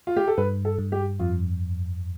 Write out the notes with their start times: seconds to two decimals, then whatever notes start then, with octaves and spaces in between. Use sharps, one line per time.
0.07 F4
0.16 G4
0.28 A4
0.38 G2 B4
0.65 A4
0.79 G2
0.92 G4
1.19 F2 F4